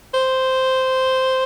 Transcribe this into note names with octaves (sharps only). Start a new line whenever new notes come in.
C5